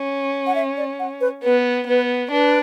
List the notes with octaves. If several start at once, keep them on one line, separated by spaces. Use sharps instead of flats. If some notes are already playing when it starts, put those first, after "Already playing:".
Already playing: C#4
F#5
E5
D5
F#5
B4
B3 B4
B3 B4
D4 B4